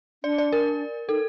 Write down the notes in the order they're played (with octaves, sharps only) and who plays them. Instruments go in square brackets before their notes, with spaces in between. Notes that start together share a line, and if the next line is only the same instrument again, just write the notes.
[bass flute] D4 [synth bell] D5
[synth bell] D5
A#4
[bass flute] D#4 [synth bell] A4